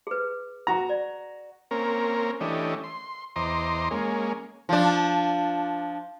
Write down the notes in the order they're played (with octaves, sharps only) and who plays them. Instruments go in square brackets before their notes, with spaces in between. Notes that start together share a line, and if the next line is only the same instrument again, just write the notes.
[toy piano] G#4 B4
[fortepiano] F#4 A#5
[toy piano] D5
[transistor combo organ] A#3 C4 C#4 A#4
E3 A3 C#4 D4 G4 D#5
C6
E2 C5 D#5 A#5 C6 D6
G#3 A#3 C#4
[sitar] F3 D4